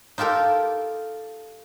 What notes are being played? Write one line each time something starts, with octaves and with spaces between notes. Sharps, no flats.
D#4 F4 G4 A4 A#4